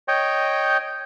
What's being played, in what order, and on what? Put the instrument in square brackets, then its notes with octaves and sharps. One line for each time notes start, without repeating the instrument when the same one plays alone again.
[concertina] C#5 D#5 G5